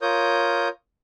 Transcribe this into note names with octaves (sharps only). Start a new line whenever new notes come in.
F4 A#4 C#5 D#6 G6